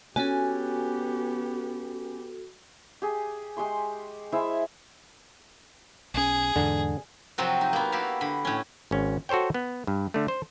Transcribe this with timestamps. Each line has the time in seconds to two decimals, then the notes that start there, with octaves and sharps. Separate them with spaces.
0.16 B3 C#4 F#4 G4 A4 G#5
3.02 G4 G#4
3.57 G#3 G4 C6 C#6
4.32 G#3 E4 C5 E5
6.14 B1 C#4 G#4
6.56 E2 G#2 D3
7.38 C3 F3 F#3 C4 F4 F#4
7.61 D#4
7.73 A#3 B3
7.92 E4 F#4 G4 F5
8.21 D3 B5
8.45 A2 C#4
8.91 G#1 C#4
9.29 F#4 A4 C5 C#5 G5
9.54 B3
9.87 G2
10.14 D3 A3
10.28 C5